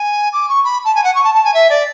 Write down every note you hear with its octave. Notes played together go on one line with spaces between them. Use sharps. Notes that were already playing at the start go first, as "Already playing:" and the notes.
Already playing: G#5
D6
C#6
B5
A5
G#5
F#5
C#6
A5
A5
G#5
E5
D5